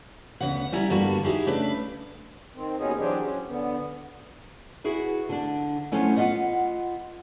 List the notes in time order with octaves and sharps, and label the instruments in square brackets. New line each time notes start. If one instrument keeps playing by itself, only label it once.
[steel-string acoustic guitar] D2 G2 C#3 B3 F#5
G3 E4 G#5 A#5
G2 D3 G3 A#3 B3 F#4
D#4 E4 G4 G#4
C#3 A3 D4 B4
[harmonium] D#3 C4
D#2 B2 B3 C#4 D#4 G#4
E3 F#3 C4 D4 G4 G#4
C#4
D3 B3
[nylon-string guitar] E4 F#4 G#4 B4
D3 D4
F3 F#3 A3 B3 C#4 E4
B3 F4 D#5 F#5